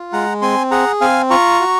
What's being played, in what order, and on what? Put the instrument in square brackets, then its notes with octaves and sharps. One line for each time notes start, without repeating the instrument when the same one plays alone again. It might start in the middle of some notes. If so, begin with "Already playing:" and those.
Already playing: [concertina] F4
G#3 F#5 A#5
C4 G#5 C6
G#4 F#5 A#5
C4 F5 G#5
F4 A#5 C#6
F#4